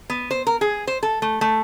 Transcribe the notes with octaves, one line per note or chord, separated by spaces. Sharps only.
B3
C5
A#4
G#4
C5
A4
A3
A3